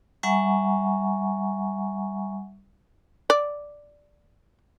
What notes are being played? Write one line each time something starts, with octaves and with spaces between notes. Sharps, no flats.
G3 E5 F#5 G#5 A#5 C#6
D5